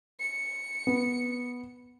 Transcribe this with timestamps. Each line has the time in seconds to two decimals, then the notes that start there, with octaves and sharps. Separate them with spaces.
0.20 C#7
0.87 B3